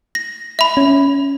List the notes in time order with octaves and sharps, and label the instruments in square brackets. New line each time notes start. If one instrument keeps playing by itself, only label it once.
[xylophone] A#6
E5 B5
[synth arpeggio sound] C#4